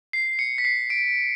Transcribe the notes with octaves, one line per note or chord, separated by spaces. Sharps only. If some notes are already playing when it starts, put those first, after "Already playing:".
C7
C#7
B6
C7
D7